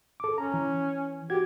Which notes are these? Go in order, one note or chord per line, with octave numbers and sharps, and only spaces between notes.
A4 D6
C#4 A#5
E3
F#4 G4 G#6